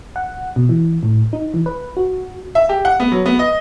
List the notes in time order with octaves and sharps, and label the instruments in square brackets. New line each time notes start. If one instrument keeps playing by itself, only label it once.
[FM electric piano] F#5
B2
E3
A2
D#4
E3
B4
F#4
[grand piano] E5
G4
F#5
B3
F#3
B3
D#5